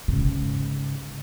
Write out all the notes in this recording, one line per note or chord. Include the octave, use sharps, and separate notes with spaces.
G#2 C#3